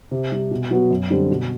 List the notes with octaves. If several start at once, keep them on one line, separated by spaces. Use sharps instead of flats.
C3
G3 C4
B2
F#3 B3 F#4
F#2
D3 G3 C4
B2